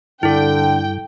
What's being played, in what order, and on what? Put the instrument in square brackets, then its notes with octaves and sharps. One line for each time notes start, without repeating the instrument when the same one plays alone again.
[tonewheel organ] G2 [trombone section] D3 [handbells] E4 A4 [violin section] G5